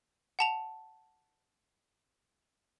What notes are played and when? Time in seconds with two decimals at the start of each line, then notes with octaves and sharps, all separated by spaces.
0.39 F#5 A5 F7